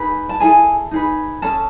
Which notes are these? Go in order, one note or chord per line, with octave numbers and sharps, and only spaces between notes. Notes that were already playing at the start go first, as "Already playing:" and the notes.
Already playing: D#4 G#4 B4
A5
E4 G#4 A4 G#5
D#4 G#4 B4
C#4 G#4 A4 A5